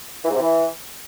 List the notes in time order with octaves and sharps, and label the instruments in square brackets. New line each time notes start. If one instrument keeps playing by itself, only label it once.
[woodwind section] E3
G#2
C3
E3